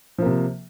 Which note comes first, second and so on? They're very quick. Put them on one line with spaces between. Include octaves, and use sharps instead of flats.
F3 A#3 C3